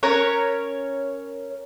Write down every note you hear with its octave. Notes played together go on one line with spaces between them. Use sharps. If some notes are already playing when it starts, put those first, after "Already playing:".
C#4 A#4 C#5 F#6